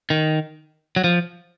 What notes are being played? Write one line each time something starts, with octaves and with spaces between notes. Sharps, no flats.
D#3
F#3
F3